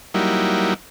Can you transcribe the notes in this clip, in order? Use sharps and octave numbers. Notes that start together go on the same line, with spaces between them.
F#3 G3 A#3 D#4 E4